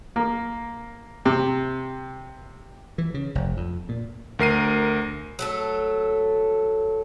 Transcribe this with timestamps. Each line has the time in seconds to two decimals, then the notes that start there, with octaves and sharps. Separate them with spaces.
0.16 A#3
1.25 C3
2.98 E3
3.14 C#3
3.35 F1
3.57 F2
3.89 A#2
4.39 D2 A#4 C7 D#7
5.39 F#3 A3 A4